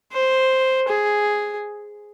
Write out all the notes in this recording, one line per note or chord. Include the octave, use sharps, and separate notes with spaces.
C5
G#4